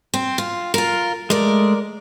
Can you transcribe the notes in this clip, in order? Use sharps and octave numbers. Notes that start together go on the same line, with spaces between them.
C4
F4
F4 A#4
G#3 A3 A#4 D5